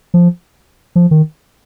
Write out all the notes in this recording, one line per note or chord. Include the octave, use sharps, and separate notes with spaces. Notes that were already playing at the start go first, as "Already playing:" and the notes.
F3
F3
D#3